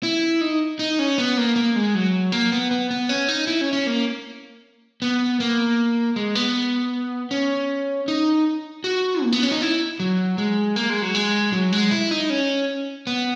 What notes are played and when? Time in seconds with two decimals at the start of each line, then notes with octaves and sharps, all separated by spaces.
0.03 E4
0.41 D#4
0.79 D#4
0.99 C#4
1.18 B3
1.37 A#3
1.56 A#3
1.76 G#3
1.95 F#3
2.32 A#3
2.52 B3
2.71 B3
2.91 B3
3.09 C#4
3.28 D#4
3.47 E4
3.61 C#4
3.73 C#4
3.87 A#3
5.02 B3
5.40 A#3
6.16 G#3
6.35 B3
7.31 C#4
8.08 D#4
8.84 F#4
9.23 A#3
9.32 B3
9.43 C#4
9.52 D#4
9.62 E4
10.00 F#3
10.38 G#3
10.76 A#3
10.90 G#3
11.02 F#3
11.15 G#3
11.53 F#3
11.72 G#3
11.91 E4
12.11 D#4
12.30 C#4
13.07 B3